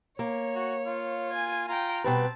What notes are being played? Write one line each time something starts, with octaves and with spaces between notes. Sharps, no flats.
A#3 C#5
F#4
F4
G#5 G#6
F4 G5 A#5
B2 G3 C4 B4 A5